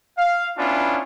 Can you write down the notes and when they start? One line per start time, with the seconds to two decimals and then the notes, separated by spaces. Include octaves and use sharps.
0.18 F5
0.57 B3 C#4 D4 E4 F4